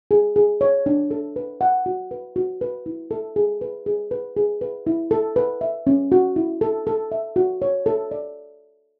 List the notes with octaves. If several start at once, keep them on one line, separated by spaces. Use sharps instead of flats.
G#4
G#4
C#5
D4
A4
B4
F#5
F#4
B4
F#4
B4
E4
A4
G#4
B4
G#4
B4
G#4
B4
E4
A4
B4
E5
C#4
F#4
E4
A4
A4
E5
F#4
C#5
A4
D5